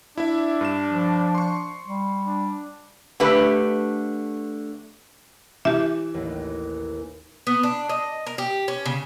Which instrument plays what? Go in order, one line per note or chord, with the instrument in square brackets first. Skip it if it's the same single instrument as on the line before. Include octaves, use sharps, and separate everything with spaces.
[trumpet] D4 [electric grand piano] E4 E5
[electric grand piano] G2 E7
[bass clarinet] F3
[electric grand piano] C6 C#6
[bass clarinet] G3
[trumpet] D4
[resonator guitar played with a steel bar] D3 A3 G4 B4
[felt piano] E3 [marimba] G4 E5
[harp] A1 D#2
[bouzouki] B3
D4
D#5
A#4
G4
C#4
C#3